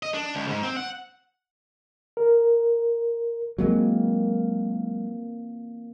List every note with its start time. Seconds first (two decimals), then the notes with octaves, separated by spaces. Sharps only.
0.03 D#5
0.14 D4
0.35 C#2
0.48 G#2
0.63 C4
0.76 F#5
2.17 A#4
3.58 E3 F#3 G#3 A#3 C4